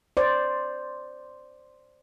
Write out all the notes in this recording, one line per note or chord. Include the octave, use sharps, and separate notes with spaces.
C5 D5